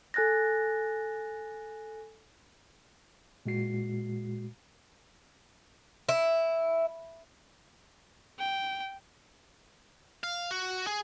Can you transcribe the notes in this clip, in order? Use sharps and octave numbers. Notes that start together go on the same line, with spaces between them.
A4 G#5 F#6 A6 A#6
A#2 G#3 F#4 C7
E4
G5
F5
F#4
G#4